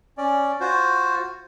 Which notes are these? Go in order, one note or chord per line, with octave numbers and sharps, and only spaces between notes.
C#4 D5
F4 F#4 C5